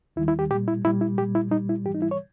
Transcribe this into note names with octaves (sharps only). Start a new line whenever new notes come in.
D#2 D#3 G3 E4
E4
G4
A#2 G3 G4
E4
A#2 G3 E4
E4
A#2 G3 G4
E4
A#2 G3 D#4
E4
G#2 E3 G3 G4
D#4
E4
C#5